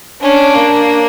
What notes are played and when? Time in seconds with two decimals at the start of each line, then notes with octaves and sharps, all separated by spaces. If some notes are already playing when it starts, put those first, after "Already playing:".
0.22 C#4 D4
0.54 A#3